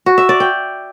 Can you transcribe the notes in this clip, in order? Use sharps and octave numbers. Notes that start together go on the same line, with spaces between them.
F#4
E5
D5
G5